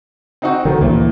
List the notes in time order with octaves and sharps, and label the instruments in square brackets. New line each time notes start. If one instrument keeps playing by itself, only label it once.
[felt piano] C4 D#4 F#4
[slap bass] D3 [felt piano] D#3 F#3
[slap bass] D2 D#3 E3 [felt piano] A#2